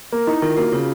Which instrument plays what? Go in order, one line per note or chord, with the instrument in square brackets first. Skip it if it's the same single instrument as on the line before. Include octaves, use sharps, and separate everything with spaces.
[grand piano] A#3
[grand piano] D#4 [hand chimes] E4
[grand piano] D#3 [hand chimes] F4
[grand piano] A#3 [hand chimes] F#4
[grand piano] C#3 [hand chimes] F4